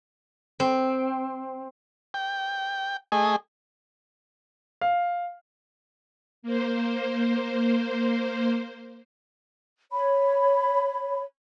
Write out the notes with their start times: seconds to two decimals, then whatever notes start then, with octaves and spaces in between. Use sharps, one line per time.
0.60 C4
2.14 G5
3.12 A3 G#4 D#5 G#5
4.81 F5
6.43 A#3 C5
9.92 C#5 B5